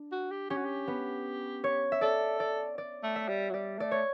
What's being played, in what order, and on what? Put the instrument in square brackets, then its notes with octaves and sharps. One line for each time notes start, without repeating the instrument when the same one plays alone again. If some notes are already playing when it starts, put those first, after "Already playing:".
Already playing: [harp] D4
[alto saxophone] F#4
G4
[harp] C#4 [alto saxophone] G4
[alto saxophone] F#4
G4
[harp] B3
C#5
E5
[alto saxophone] A4 [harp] D5
[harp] D5
D5
[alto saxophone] A3
[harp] E5
[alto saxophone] G3
F#3
[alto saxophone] G3 [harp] D5
[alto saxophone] A3 [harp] D5
[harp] C#5